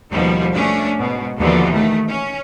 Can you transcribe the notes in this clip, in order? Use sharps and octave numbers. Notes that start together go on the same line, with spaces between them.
D#2 B2 F3 G3
A3 C#4 D4
G#2 B2
D#2 B2 D3 E3 F3
D#3 A3
C#4